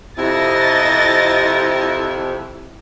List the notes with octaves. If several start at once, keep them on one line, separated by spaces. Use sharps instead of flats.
F2 C3 E4 D#5 A6 A#6